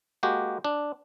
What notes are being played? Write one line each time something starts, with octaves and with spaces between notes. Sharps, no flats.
G#3 A#3 F#4 G4
D4